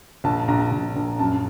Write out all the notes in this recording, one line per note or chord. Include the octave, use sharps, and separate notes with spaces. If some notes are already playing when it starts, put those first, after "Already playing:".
A#1 A5
A#1 A#5
A#1
A#1
F#2 A5